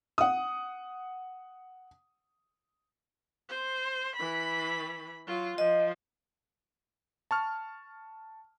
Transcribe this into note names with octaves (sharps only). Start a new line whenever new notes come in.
F#5 D#6
C5
E3 B5
F#3 F4
F3 D#5
A5 C#6 F6